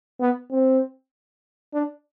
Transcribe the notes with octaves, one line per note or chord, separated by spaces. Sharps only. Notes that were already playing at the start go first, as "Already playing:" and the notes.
B3
C4
D4